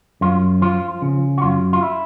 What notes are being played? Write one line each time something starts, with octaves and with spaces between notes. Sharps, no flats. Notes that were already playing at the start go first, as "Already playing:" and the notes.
F#2 F4
F3 F4
C#3
F#4
F#2 F4
F4
E4